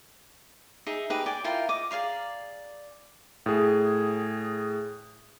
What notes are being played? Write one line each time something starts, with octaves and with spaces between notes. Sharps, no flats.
D#4 G#4 E5
D#4 G4 G#4 B4
D5 G5 G#5
E4 F4 A#4 G5
D#5 D6
G#4 D5 F5 A#5
A2 G#4